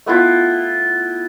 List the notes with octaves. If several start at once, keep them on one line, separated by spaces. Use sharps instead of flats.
A3 B3 E4 F4